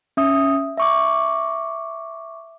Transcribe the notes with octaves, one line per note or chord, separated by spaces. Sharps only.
C#4 E5 D#6
E5 C#6 D6